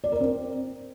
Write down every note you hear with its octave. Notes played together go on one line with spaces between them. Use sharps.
D5
A#4
C4